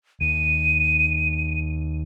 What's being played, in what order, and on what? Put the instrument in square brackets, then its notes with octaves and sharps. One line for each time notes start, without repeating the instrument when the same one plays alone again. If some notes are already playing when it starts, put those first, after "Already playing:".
[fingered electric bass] D#2 [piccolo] D#7